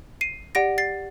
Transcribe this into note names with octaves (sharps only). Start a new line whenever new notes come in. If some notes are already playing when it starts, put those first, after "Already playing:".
C7 D#7
G4 D5 F#5 A#6 D7
A6 C7